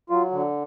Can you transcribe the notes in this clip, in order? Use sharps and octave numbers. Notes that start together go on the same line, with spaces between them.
F#3 F4
D3